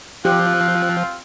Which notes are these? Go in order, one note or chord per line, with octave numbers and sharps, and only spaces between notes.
F3 C4 F4 G4 F#6